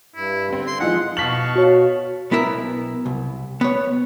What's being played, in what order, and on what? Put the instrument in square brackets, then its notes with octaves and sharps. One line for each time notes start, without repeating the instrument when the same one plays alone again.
[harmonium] G2 [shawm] E4
[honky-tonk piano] D3 C4
[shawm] C6
[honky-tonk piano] E3 F3 D#4 [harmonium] G#3 F4 [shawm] F#5
[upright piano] B2 B6 F#7 [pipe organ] F5 A5 C#6
[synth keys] F#4 C#5
[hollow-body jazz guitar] B1 B3 E4 A#4 E5
C2
B3 C#5